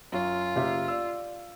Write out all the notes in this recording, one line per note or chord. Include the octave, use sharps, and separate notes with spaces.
F#2 F4 C#5
F#1 G4 E5
D5 E6